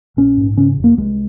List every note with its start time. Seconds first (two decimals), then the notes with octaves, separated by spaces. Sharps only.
0.17 A#1 C#4
0.38 G#2
0.57 C#3 C#4
0.78 F1
0.84 A#3
0.97 C2 G#3